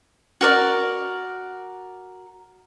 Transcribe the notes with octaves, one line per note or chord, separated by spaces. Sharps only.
F#4 A#4 D5